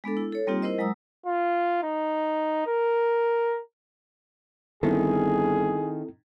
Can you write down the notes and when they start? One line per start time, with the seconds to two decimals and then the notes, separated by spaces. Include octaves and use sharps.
0.04 G#3 B3 D4 A4
0.17 E4
0.32 A4 C#5
0.47 G3 A#3 C4 D#4 F4 G4
0.62 E4 A#4 C5 D#5
0.78 F#3 G#3 A#5 D#6 E6
1.26 F4
1.82 D#4
2.66 A#4
4.83 G1 D#3 C4 E4 G#4 A4